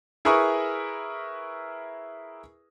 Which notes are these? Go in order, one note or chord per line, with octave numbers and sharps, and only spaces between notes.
E4 G#4 A#4 B4 C#6 D#6